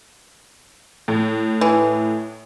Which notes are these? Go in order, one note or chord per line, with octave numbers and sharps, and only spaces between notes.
A2
E3